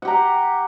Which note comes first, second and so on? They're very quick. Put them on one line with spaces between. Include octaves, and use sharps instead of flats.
F#5 G4 A#5